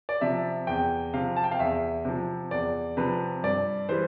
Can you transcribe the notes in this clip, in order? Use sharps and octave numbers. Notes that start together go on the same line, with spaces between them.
D5
C3 F3 E5
E2 G5
C3 F3 F5
A5
G5
F5
E2 E5
C3 F3
E2 D5
C3 F3 B4
G2 D5
E3 G3 C5